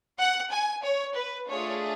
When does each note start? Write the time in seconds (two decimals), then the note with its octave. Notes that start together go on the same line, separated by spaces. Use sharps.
0.19 F#5
0.52 G#5
0.84 C#5
1.16 B4
1.48 A3 D4 F4 G#4 C#5